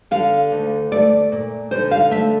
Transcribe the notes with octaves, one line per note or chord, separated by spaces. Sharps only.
D3 F5
D2
A3 D5
A#2
D3 C5
F5
A3 E5